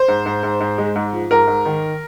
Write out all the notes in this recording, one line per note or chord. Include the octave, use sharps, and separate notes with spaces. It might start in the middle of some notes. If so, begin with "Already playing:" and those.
Already playing: C5
G#2
G#2
G#2
G#2
G#3
G#2
F3
G#2 A#4
G#2
D#3